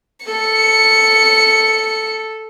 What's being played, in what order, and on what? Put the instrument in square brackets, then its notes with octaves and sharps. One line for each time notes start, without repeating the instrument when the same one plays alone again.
[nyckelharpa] A4 [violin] C#7